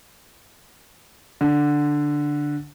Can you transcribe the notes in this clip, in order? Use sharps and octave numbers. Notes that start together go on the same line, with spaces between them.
D3